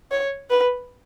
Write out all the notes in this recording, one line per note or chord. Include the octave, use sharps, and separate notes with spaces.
C#5
B4